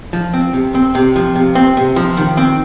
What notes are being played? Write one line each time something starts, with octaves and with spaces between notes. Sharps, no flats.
F3
C4
C3
C4
C3
F3
C3
C4
C3
F3
D#3
C4